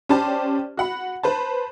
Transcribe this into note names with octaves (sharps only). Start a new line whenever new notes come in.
C#4 G4 C5 D5 A5
F#4 F#5 B5
B4 C5 A5